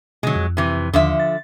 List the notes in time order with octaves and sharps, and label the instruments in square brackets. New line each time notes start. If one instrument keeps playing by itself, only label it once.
[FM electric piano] B2 D3 [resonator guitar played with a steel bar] F#3 G#3
[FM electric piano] F2
[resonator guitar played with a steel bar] C3 E3
[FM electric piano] D#2 [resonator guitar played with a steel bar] D3 F3 E5
[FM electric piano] A6